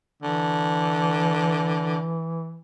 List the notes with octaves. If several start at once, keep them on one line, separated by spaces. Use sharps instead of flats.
D3 E3